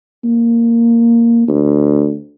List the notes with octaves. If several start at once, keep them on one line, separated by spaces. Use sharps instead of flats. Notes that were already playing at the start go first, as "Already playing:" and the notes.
A#3
D2